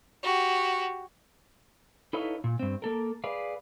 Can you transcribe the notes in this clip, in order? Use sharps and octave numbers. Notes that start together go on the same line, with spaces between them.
F#4 G4
D#4 E4 A4 B4 C#5 F5
A#2
G2 C4
A#3 A4 A#4
G#4 B4 D5 F5